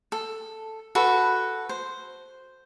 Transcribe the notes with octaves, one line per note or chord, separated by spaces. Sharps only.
A4
F#4 A4 B4
C5